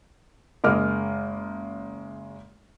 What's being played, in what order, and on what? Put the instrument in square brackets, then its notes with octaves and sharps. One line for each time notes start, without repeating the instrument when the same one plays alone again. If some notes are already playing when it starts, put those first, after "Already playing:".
[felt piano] F#1 G#3 D#5 D6 F6